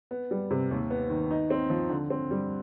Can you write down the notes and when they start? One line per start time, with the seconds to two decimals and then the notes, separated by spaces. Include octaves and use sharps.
0.11 B3
0.31 G3
0.51 C3
0.71 D#2
0.90 B3
1.10 D#3
1.31 D#4
1.50 C4
1.70 F3
1.90 D3
2.10 C4
2.31 G3